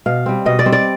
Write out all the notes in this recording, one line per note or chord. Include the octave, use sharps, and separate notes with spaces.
B2 F5
G3 C4
B2 D#5
D5
G3 C4
D5